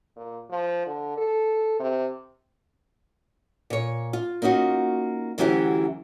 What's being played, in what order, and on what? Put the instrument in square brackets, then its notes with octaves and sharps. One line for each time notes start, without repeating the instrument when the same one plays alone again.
[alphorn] A#2
F3
D3
A4
C3
[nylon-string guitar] A#2 C#5
F4
A#3 C#4 D#4 F4 F#4
D2 E3 F#3 C#4 E4 G4